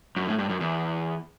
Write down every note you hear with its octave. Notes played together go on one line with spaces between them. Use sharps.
F#2
A2
G2
F#2
E2